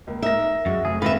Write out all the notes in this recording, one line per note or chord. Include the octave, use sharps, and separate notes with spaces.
C#2 A#3
D#4 A#4 E5 A#6
F#2 G#3 F#4
F1 G#4
G#2 D#3 A#3 C4 B4 E5 A#6